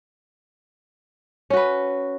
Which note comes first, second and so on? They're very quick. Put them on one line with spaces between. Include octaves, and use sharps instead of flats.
C#4 F#4 B4